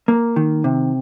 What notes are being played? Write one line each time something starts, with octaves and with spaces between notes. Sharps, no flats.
A#3
D#3
C3